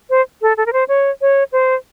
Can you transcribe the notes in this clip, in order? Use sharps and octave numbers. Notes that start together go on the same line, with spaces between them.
C5
A4
A4
A#4
C5
C#5
C#5
C5